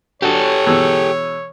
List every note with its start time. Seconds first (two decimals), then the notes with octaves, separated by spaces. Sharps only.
0.22 F#3 D4 F#4 G4 A4 C#5
0.66 B2 E3 G#3